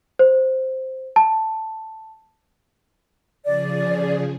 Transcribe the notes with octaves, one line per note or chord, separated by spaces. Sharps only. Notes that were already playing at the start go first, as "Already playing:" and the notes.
C5
A5
C#3 F3 G#4 D5